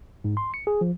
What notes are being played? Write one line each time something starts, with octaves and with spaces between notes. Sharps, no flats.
G#2
C6
C#7
G#4
F3